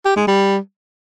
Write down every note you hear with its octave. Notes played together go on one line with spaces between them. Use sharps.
G4
G#3
G3